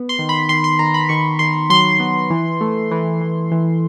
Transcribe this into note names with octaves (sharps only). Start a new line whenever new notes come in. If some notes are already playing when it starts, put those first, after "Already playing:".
Already playing: B3
C6
D#3
B5
D#3 C6
C6
D#3 A#5
B5
D#3 C#6
D#3 C6
F#3 C6
B3
E3
A3
E3
E3
E3